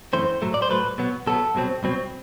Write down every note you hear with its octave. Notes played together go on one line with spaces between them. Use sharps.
F#2 E3 A3 C4 C5
A2 F#3 A3
D5
C5
A2 F#3 A3 B4
B2 F#3 B3
B2 F#3 B3 A4
C2 B2 F#3 C4
C2 B2 F#3 C4